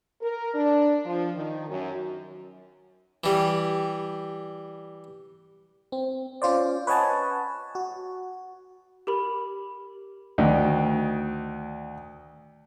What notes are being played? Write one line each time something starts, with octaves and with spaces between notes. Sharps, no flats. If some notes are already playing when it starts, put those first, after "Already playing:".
A#4
D4
F3
D#3
F#2
E3 G3
C4
C#4 F4 C5 D5
B4 C#5 D#5 F#5 G#5 A5
F#4
G4 A#4 B5
D2 D#3 D4 D#5